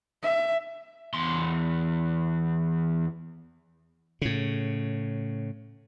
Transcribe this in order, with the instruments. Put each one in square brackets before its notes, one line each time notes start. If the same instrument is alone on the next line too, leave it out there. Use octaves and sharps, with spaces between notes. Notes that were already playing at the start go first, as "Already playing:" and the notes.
[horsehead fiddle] E5
[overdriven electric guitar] E2 C6
[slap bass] A2 C#3